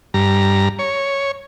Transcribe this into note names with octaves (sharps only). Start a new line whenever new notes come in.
G2 A#5
C#5